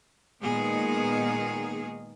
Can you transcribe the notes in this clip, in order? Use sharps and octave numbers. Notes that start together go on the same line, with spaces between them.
A#2 D#3 G#3 B3 D#4 G#4